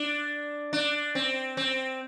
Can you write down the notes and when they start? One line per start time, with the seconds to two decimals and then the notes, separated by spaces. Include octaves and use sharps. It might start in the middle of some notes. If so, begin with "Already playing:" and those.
Already playing: D4
0.73 D4
1.15 C4
1.57 C4